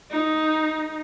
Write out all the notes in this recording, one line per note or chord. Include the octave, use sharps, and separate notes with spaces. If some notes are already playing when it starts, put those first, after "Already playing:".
D#4